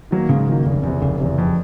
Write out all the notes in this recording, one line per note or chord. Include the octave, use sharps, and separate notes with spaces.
D#3 F#3 A#3
G#2 C#3
D#3 F#3 A#3
F1
E2 C3
F1 C#3
E2 C3
F2